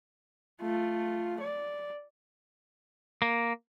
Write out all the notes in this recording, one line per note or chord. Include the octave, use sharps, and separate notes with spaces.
A3 F4
D5
A#3